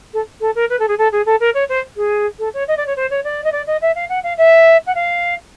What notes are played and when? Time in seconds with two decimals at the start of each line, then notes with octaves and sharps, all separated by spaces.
0.13 A4
0.40 A4
0.55 A#4
0.69 B4
0.79 A4
0.87 G#4
0.98 A4
1.11 G#4
1.25 A4
1.40 A#4
1.54 C#5
1.68 C5
1.96 G#4
2.38 A4
2.53 C#5
2.67 D#5
2.77 D5
2.86 C#5
2.96 C5
3.10 C#5
3.23 D5
3.43 D#5
3.51 D5
3.66 D#5
3.81 E5
3.95 F5
4.09 F#5
4.23 F5
4.37 E5
4.86 F#5
4.94 F5